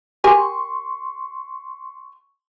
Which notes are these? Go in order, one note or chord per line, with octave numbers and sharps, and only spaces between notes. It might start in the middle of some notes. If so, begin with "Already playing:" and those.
G4 A#4 G#5 C6 C#6